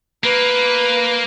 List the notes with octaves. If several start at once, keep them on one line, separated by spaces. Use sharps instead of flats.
A#3 B4